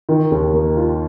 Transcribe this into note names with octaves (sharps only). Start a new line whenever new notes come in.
D#3
D#2
A#3
F4